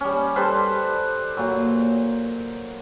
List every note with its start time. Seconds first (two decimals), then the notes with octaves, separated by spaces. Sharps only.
0.01 G3 C#4
0.36 G3 A4 B4 C5
1.37 A#2 F#3